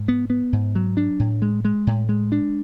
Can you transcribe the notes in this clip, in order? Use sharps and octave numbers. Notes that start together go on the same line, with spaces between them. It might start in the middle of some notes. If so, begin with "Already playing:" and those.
Already playing: G#2
B3
B3
G#2
F#3
D4
A2
G#3
G#3
A2
G#3
D4